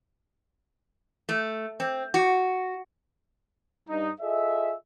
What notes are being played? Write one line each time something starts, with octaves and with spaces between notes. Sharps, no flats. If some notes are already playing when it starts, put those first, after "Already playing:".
A3
C4
F#4
G2 D#4
F4 G#4 A4 D#5 E5